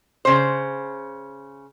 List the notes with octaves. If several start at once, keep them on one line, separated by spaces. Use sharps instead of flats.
C#3 C5